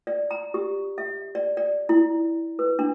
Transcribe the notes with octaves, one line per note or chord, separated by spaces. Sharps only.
D5
A#5
G4
E5
D5
D5
E4
B4
D4